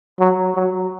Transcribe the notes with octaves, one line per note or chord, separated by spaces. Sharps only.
F#3
F#3